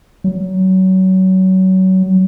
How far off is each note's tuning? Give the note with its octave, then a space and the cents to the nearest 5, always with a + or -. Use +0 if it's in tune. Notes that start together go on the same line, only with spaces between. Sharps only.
F#3 +25